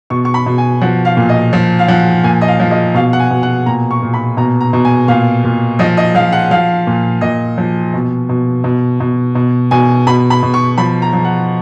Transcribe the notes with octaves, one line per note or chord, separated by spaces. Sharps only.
B2 C#6
C#6
B5
B2
G#5
F3 F#5
F5
A#2
D#5
F3
F5
F3 F#5
A#2 G#5
D#5
F5
F3
D#5
B2 F5
F#5
G#5
B2
F#5
A#2 A#5
C#6
A#2
B5
B2 A#5
A#5
B2
G#5
A#2 F5
A#2
F3 D#5
D#5
F3 F5
F#5
F3 F5
A#2
A#2 D#5
F3
B2
B2
B2
B2
B2
B2 G#5
B2 B5
B5
B2
C#6
F3 B5
A#5
F3
F#5